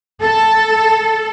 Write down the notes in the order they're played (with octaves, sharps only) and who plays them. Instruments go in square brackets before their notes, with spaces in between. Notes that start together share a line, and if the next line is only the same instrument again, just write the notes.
[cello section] A4